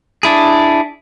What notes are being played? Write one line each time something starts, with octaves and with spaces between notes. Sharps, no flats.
D4 E4 G#4